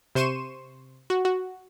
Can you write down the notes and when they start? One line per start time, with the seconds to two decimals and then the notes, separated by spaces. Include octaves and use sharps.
0.15 C3 C5 C6 C#6 D#7 E7
1.10 F#4
1.25 F#4